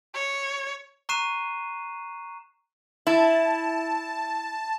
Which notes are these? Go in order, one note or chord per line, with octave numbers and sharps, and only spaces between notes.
C#5
A#5 C#6 F#6 C7 D#7 E7
E4 A5